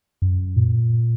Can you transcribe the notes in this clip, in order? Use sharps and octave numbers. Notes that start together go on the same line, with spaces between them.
F#2
A#2